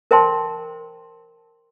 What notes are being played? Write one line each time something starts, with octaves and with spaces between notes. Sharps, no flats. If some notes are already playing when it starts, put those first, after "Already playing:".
A#4 C5 E5 G5 A5 C6